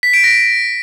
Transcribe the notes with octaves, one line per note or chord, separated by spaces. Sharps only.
B6
D7
A#6